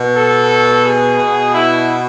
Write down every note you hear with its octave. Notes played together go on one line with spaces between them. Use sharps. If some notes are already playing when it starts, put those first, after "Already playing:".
Already playing: B2
A4
G#4
B2
E4